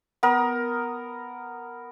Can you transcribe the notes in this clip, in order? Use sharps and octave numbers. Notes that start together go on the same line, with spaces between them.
B3 A#4